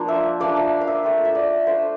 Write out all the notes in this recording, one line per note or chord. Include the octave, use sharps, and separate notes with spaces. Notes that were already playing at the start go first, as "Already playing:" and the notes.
Already playing: F3 A#3 D4 F4 A#4 C5
E5
A#3 D4 F4 D5
E5
F5
E5
A3 C4 F4
E5
D5
A3 D4 F4 C5